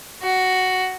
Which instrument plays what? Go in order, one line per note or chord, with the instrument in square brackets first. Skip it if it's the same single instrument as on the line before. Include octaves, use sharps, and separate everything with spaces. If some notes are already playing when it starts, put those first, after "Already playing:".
[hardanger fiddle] F#4